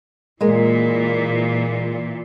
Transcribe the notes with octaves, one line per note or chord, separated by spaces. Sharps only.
A#2 E3 G#3 A#3 A#4